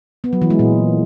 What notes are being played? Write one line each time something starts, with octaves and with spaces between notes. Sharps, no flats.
B3
F#3
E3
G#3
A#2